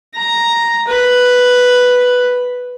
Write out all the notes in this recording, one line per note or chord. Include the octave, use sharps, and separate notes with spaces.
A#5
B4